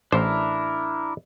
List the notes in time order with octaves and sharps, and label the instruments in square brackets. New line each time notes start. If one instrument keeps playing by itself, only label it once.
[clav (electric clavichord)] A1 C5 [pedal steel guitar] D4 E4 A#4